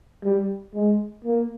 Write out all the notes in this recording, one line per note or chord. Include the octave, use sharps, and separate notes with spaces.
G3
G#3
A#3